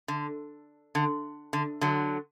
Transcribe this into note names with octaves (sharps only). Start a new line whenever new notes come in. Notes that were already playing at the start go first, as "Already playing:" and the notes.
D3
D3
D3
D3 F#3